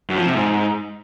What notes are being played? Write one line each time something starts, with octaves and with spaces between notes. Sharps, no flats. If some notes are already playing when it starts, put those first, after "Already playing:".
F#2
F3
C3
G#2